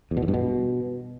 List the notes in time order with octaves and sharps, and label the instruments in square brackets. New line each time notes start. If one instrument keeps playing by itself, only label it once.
[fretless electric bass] E2
B2
E2
G2
B2